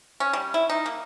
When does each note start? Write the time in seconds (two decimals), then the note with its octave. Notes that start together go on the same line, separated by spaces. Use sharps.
0.20 C#4
0.33 G3
0.54 E4
0.69 D#4
0.86 A#3